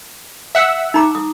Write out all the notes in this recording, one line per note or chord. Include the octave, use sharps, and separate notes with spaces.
E5 F#5 E6
D#4 A#5 D6
D#6